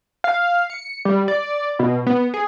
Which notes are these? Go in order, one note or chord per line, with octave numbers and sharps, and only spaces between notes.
F5
C#7
G3
D5
B2
B3
G#4